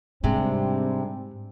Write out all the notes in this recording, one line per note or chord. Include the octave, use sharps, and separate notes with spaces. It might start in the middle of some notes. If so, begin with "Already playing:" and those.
G#2 C3 G3 G#3 C4 D4